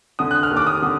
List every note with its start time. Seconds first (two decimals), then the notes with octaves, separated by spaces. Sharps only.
0.19 D3 D#6
0.31 F#6
0.43 F6
0.50 D#2
0.57 D6
0.67 D#6
0.82 D3